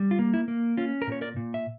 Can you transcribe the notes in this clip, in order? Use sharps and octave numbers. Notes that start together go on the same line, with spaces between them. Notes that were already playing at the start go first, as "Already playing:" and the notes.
Already playing: G3
F4
A#3
E4
A#3
C#4 F4
A#4
A#2 C#5
A#4 D5
A#2
E5